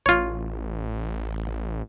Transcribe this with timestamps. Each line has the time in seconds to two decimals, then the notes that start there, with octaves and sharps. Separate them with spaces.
0.06 A1 F4 C#5